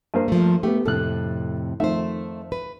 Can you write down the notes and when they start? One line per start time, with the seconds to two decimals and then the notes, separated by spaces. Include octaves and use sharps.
0.14 G2 A#3 C5
0.28 F3 A3
0.63 A3 B3 G4
0.86 F2 A2 C3 A4 F#6
1.80 F2 D#3 A3 C5 E5
2.52 B4